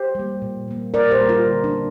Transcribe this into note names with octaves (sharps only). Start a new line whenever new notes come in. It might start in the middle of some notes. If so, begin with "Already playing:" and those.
Already playing: G4 C5
G3 A#3
A#2
G3 A#3
A#2 A#4 D5
G4 C5
G3 A#3
F4 A#4
D3
D4
A#3